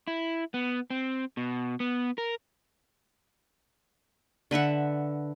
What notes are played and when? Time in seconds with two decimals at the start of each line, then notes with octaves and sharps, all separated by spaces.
0.07 E4
0.54 B3
0.90 C4
1.37 B2
1.80 B3
2.18 A#4
4.51 D3 B4 E5 F#5